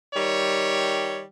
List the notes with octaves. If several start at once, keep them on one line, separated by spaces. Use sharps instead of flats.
D#3 G3 C#5